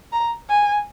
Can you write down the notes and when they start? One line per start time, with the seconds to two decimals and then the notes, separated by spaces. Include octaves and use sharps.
0.12 A#5
0.49 G#5